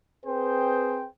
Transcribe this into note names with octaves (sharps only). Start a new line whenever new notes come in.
C4 G#4 B4 C5 G5